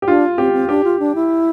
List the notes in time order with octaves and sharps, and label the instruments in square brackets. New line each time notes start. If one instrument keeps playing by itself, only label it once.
[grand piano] G4
[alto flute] D4 [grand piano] F4
[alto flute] C4 [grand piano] G4
[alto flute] C4
[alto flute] D4 [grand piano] G4
[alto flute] F4
D4
E4